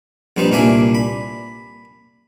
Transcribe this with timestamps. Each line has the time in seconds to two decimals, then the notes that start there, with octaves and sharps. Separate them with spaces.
0.37 A#1 G3 C4 D#4 B4
0.52 C2 A#2 A#3 D4 E5 G#5
0.95 B5